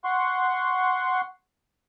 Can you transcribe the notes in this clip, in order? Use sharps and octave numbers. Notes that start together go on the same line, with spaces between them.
F#5 C6 C#6